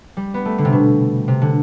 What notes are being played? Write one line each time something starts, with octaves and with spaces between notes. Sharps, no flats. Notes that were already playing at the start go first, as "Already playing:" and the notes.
G3
B3
A3
D3
C3
B2
C3
D3